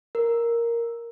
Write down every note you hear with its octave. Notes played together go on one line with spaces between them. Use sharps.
A#4